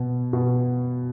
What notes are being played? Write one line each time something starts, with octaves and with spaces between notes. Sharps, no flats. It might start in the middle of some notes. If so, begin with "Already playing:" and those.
Already playing: B2
B2